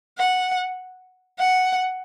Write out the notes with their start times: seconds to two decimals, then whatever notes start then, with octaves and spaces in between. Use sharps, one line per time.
0.18 F#5
1.39 F#5